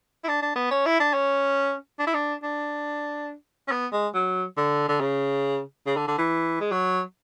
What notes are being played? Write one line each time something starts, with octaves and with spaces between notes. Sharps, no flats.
E4
D4
D4
B3
C#4
E4
D4
C#4
D4
E4
D4
D4
C#4
B3
G#3
F#3
D3
D3
C#3
C#3
D3
D3
E3
G#3
F#3